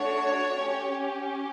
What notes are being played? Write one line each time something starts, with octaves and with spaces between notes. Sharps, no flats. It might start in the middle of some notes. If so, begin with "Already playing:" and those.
Already playing: A3 D4 F#4 A4 C#5
C#4 G4